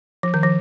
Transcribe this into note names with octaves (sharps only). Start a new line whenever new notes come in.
F3
D#3
F3